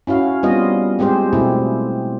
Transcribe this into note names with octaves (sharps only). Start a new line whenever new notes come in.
C#4 E4 F#4 F5
G3 B3 C4 F4 D#5
G#3 C4 G4 G#4 C5
B2 A3 C4 E4